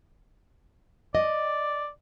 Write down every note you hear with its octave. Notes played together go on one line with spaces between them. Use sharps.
D5 D#5